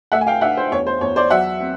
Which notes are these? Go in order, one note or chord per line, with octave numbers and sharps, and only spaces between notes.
A3 E5 F#5
G#5
F5 G5
D4 E5 F#5
C5
E2 C#5
C5
E2 C#5
C5 D5
F#3 E5 F#5
C4